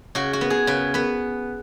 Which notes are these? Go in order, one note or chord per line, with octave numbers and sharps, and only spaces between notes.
C#3 F#4
F#4
B3
G#4
C#3 B4
B3 B4